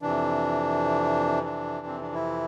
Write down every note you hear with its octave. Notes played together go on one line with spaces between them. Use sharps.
F2 C3 E3 D4
D4
C4
D4
E4